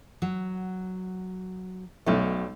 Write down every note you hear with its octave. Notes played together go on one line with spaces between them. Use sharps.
F#3
B1 F#3 G3 A3